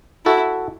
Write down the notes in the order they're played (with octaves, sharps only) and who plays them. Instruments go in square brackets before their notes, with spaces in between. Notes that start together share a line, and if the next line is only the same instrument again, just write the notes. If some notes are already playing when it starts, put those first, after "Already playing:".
[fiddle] E4 [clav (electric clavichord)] F#4 A4